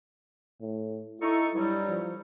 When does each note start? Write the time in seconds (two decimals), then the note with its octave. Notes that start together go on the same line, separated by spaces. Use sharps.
0.61 A2
1.21 D#4 E4 A4 C#6
1.55 G2 F#3 G3 E4
1.88 F3